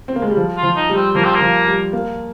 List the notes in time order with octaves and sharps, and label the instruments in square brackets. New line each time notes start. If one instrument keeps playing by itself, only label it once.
[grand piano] C4
A#3
G#3
G3
F3
[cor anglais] F4
[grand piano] F3
[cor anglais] D#4
[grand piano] G3
[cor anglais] C4
[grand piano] F3 [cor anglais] A#3
[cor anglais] C4
A#3
[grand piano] F3
G3
A#3